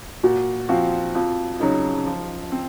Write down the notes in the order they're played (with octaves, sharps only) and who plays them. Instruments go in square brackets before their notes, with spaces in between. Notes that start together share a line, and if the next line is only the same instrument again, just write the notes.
[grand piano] A#2 [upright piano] F#4
[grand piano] F3 C4 F#4 [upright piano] F4
[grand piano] F2 [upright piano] F4
[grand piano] C#3 F#3 [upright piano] D#4
[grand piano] F3
C4